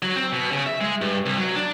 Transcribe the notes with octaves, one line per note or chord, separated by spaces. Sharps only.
F#3
C4
B2
C#3
E5
G#3
G2
C2
F#3
D4